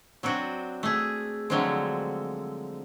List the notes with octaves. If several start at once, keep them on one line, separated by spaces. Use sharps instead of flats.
F#3 C4 D4 F#4
A3 G#4
D3 F3 F#3 G#3 A3 C4